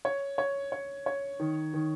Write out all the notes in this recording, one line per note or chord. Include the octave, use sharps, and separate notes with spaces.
C#5
C#5
C#5
C#5
D#3
D#3